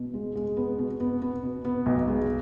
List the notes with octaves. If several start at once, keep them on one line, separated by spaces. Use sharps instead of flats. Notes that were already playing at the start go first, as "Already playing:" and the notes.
Already playing: B2
G#3
G#3
B3
B2
B3
B3
B2
B3
B1
G#3